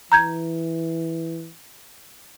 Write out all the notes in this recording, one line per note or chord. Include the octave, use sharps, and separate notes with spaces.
E3 A#5 G6 G#6